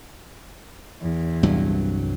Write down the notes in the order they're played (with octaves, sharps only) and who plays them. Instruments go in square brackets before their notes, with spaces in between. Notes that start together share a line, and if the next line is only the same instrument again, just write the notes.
[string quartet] E2
[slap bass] C2 G2 F#3